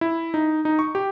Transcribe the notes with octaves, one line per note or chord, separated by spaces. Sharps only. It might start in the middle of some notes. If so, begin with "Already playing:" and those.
E4
D#4
D#4
C#6
G4